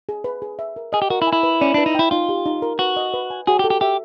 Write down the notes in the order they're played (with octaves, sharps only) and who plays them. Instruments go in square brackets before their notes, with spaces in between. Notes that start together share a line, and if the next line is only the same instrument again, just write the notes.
[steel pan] G#4
B4
G#4
E5
A#4
[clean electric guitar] G#4 [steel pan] D#5
[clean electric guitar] G4
[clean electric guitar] F#4 [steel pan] A#4
[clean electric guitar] E4
[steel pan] G#5
[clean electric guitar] E4
[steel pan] B4
[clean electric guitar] C#4 [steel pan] D5
[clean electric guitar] D4 [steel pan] B4
[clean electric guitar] D#4
[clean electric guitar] E4 [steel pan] G5
[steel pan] D#4 [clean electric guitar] F4
[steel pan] G4
D#4
A#4
[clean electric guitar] F#4 [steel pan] B4
[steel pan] D#5
B4
G#5
[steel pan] F#4 [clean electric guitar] G#4
[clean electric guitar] G4
[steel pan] A4
[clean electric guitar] G4
[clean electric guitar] G4 [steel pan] E5